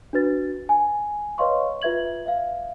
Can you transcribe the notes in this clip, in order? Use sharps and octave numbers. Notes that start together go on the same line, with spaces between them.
D4 F#4 B4 A6
G#5
B4 C#5 D#5 F5 C6 C#6
F4 B4 E5 G#6 F#7
E5 F5